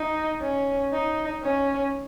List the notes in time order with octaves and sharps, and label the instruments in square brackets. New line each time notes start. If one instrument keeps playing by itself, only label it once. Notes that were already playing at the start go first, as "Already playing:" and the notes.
Already playing: [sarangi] D#4
C#4
D#4
C#4